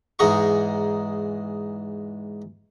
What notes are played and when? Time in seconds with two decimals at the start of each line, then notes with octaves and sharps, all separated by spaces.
0.19 E2 G#2 G#3 D#4 A#5 C#6